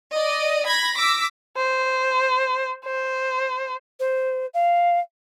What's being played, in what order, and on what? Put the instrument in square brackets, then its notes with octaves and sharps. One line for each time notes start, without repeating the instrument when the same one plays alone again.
[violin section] D5 D#5
B5 G#6 A#6
D6 E6 A#6 B6
[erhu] C5
C5
[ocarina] C5
F5